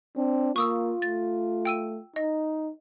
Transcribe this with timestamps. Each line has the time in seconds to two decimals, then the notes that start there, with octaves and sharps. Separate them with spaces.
0.16 C4 D4
0.56 A#3 F4 C#6 D#6 E6
1.02 A3 A6
1.65 G5 E6 D#7
2.16 D#4 D#5